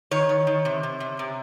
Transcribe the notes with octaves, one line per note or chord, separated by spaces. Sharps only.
D#3 C#5
D#3
D#3
C3
C3
C3
C3